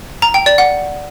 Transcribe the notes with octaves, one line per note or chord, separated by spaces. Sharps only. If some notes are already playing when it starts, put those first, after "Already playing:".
A#5
G5
D5
F#5